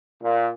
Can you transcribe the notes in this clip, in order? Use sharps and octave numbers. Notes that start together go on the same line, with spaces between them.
A#2